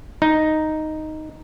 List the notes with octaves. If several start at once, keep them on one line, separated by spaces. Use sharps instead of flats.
D#4